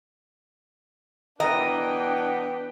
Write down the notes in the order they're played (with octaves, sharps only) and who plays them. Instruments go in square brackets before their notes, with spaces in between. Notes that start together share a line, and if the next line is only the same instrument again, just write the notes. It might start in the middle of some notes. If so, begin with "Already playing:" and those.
[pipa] B2 G3 A#4 [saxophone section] E3 B3 [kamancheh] D4 G5 [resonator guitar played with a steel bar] D#5